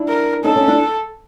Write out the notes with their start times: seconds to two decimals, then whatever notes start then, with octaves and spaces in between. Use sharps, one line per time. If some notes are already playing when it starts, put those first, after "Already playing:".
Already playing: D4 E4
0.09 A#4
0.44 C#4 D#4 A4
0.56 C#4 D#4
0.68 D4 E4